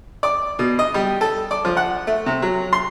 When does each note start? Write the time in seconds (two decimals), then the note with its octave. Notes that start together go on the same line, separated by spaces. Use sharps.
0.23 D5
0.59 B2
0.79 D#5
0.94 G3
1.21 A4
1.51 D5
1.65 F3
1.77 F#5
2.07 A3
2.26 C3
2.42 F#3
2.73 C6